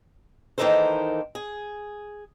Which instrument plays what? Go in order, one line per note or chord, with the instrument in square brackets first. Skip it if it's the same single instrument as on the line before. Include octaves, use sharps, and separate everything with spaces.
[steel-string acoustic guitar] D#3 E3 A#3 D#4 A4 C5
G#4